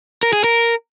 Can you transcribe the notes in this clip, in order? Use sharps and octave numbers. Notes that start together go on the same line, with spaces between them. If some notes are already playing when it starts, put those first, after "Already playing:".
A#4
G#4
A#4